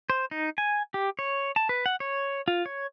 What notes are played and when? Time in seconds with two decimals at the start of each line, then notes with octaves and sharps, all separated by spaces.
0.10 C5
0.31 D#4
0.58 G#5
0.94 G4
1.19 C#5
1.56 A5
1.69 B4
1.86 F#5
2.00 C#5
2.48 F4
2.66 C#5